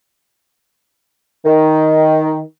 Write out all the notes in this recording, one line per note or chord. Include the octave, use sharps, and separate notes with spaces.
D#3